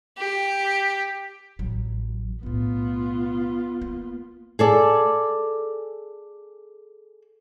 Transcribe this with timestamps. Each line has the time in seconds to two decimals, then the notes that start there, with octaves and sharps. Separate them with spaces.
0.18 G4
1.59 A1 F#3
2.43 B1 A2 B3 F4
3.82 A#3
4.59 G#4 A4 D5